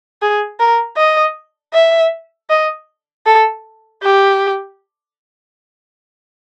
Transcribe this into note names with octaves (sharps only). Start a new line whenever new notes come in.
G#4
A#4
D#5
E5
D#5
A4
G4